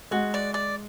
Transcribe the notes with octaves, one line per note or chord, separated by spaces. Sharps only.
G#3 F#4
D5
D5